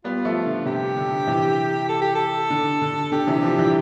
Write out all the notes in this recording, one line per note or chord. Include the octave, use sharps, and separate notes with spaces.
G3 B3 F4
F3 A3
D3
C3 G4
D3
C3 E3
A4
G4
A4
D3
D3
D3 G4
C3 E3
D3 F3
E3 G3